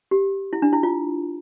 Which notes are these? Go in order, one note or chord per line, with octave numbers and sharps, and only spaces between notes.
G4
E4
D4
E4
F4